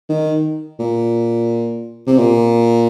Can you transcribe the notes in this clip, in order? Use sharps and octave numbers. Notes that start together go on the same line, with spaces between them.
D#3
A#2
C3
A#2